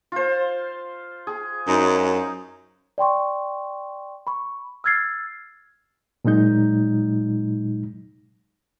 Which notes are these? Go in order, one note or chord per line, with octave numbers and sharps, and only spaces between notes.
F4 C5
G#4
F#2 D#4
D5 G5 C6 C#6
B5 C#6
E6 F6 G#6 A6 C7
A#2 F#3 G#3 D#4 G6